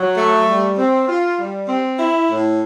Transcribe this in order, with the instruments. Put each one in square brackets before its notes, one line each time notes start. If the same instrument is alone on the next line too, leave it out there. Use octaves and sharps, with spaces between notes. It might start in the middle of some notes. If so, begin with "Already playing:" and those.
Already playing: [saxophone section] F#3
A3
G3
C4
F4
G3
C4
E4
A2